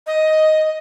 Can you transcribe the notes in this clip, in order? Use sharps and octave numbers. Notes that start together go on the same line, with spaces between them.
D#5